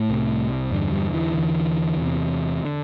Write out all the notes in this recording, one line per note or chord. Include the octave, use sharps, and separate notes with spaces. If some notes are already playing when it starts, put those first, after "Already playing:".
Already playing: A2 A3
C2 C3
E2 G2 D3 G3
G2 G3
E3
E2 D3
E2 C3
D3